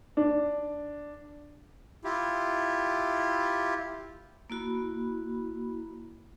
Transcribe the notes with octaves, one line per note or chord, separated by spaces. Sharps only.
D4
E4 F4 G4
A#3 E4 F#4 B5